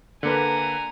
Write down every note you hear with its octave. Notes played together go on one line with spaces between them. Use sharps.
D3 A#3 B4 G#5 A#5